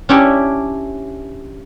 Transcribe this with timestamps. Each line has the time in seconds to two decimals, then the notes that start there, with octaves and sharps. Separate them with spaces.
0.09 C#4 D4 E4 G4 C#5